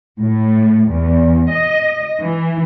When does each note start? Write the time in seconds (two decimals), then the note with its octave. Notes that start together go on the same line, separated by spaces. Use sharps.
0.18 A2
0.91 E2
1.51 D#5
2.20 E3